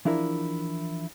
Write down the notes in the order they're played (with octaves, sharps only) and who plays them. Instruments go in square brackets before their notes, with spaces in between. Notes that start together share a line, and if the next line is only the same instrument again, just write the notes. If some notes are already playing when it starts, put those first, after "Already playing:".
[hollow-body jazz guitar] E3 F3 D4 E4 G#4 A#4